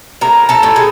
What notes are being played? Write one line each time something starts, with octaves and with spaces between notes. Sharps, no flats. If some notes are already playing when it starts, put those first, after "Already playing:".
A2 A#4 A#5
A4 A5
A2
G#4